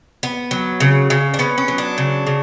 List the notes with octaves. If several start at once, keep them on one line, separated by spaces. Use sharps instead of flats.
B3
F#3
C#3
C#3
D4
B3 C#4
C#4
F#3
D4
C#3
C#3